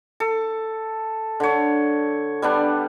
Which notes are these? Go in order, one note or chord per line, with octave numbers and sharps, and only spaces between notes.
A4
D3 C#5
G3 B3 D4